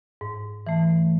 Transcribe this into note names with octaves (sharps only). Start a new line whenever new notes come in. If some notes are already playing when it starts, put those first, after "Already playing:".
G#2
E3 A3